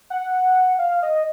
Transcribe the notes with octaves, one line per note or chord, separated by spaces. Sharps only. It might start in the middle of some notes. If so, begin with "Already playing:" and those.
F#5
F5
D#5